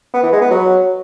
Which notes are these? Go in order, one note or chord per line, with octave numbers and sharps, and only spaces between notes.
B3
E3
G#3
B3
F#3